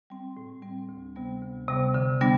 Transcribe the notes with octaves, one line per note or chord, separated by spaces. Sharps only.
G3 C4
A2
G3 C4
D2
C3 G3 B3
D2
C3 G3 B3
D3
G3 B3 D4